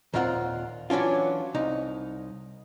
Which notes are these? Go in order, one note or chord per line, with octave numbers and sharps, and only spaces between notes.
D#2 A#2 C4 F4 F#5 A#5
E3 F#3 C#4 D4 F4
C2 D#4